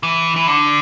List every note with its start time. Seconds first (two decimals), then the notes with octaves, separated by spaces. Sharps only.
0.03 E3
0.36 E3
0.47 D3